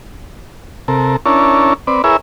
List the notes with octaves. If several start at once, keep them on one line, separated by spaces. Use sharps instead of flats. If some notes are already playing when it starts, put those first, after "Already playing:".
C3 A4 A#4
C#4 D4 E4 A#4 C#5 A5
C4 B4 D5
E4 G#4 A#4 B4 C#5 E5